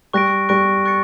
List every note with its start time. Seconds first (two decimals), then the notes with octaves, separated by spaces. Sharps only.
0.13 G3 C#6 F#6 A#6 D7
0.49 G3 C#6 F#6 A#6 D7
0.85 C#6 F#6 A6 C#7